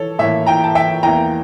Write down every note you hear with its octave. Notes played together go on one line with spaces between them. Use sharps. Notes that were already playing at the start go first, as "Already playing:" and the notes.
Already playing: E3 A4 C#5
A2 E3 A#3 C#5 E5
G5 A#5
A5
E5 G5
E2 E3 A#3 G5 A#5